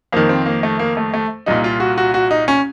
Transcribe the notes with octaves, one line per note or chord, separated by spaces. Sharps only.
F2 D#3 A#3
C4
A#3
A3
A#3
A3
A3
C2 A#2 D#4
F4
F#4
F#4
F#4
D#4
C#4